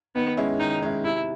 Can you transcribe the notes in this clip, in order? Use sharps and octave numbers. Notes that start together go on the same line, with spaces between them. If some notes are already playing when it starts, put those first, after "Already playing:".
D#3 B3
G#3 C#4 E4
D#3 D#4
G#3 C#4 E4
C3 E4